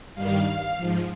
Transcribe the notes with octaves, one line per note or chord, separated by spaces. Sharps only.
G2 D#3 G3 F5
G#2 F3